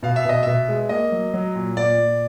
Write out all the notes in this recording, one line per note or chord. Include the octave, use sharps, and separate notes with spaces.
B2 F5
E5
B2 D#5
B2 E5
G#3
A#3 D#5
F#3
F#3
A#2
A#2 D5
A#2